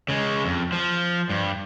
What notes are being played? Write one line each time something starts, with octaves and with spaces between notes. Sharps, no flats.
C#3 G#3
F2
F3
G2